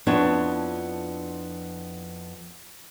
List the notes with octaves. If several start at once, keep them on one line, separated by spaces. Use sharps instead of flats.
F2 F3 B3 D4 E4 C#5